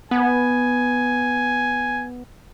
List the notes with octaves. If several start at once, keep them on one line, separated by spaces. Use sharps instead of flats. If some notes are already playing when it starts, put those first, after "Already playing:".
B3 G#5